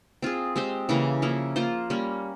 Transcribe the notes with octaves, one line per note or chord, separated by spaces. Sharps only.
C4 F4 G#4
G#3 C4 G4 C5
C#3 E3 A#3
F3 A#3 E4
A#3 F4 C5
G3 A#3 C#4